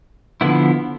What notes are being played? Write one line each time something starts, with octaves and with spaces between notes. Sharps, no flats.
D3 F3 B3 E4